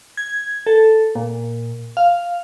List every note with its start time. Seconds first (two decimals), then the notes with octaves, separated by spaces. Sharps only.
0.17 G#6
0.66 A4
1.15 A#2
1.97 F5